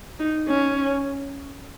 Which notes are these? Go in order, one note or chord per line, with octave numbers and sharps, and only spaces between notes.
D#4
C#4